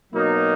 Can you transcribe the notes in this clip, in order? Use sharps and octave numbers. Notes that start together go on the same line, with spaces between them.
B2 F#3 A#3 D#4